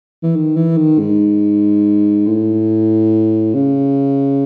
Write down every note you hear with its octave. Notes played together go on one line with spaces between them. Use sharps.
E3
D#3
E3
D#3
G#2
A2
C#3